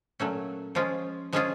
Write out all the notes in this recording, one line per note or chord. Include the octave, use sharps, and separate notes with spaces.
A#2 F#3 A3 C#4
F3 G#3 C#4 F4 G#4
F3 G#3 C#4 F4 G#4